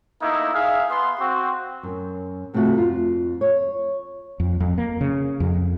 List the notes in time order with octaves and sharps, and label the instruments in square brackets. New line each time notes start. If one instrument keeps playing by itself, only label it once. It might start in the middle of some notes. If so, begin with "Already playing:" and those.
[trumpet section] A3 A#3 D#4 E4
G#4 E5 F5
B3 C6
C4 F#4
[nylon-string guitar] F#2
G2 C3 A3 F4 F#4 E5
F2 F4
C#5
[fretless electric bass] F2
F2
A#3
C#3
F2